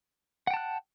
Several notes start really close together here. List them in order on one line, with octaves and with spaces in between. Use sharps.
F#5 G5 A5 F#6